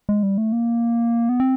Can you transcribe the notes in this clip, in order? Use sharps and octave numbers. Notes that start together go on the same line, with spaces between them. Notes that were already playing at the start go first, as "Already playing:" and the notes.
G#3
G3
A3
A#3
B3
C4